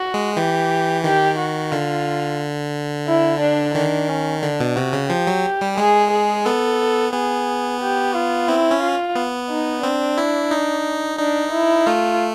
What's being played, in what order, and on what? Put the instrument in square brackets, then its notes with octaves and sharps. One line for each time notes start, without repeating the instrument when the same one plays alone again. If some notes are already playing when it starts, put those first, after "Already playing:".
Already playing: [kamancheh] F#4
[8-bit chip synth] G#3
[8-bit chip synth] E3 [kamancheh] G4
[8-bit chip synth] D#3 [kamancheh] G4
[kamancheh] F#4
[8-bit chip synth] D3 [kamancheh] F4
[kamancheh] E4
D4
[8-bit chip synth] D#3 [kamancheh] D4
[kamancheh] C#4
[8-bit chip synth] D3 [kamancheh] D4
[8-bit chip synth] B2
[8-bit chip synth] C3 [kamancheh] F#4
[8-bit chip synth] C#3
[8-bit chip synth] F3 [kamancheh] G4
[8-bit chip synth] F#3
G3
[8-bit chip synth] G#3 [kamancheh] G#4
[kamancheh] G#4
[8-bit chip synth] B3 [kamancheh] A4
[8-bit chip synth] B3 [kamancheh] G#4
[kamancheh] G4
F4
[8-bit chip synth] C4 [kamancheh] E4
[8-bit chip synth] C#4
[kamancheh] F4
[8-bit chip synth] B3
[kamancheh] D#4
[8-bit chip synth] C4 [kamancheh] D4
[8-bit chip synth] E4
D#4
[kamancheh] D4 [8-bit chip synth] D#4
[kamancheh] E4
[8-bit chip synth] A3 [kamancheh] F4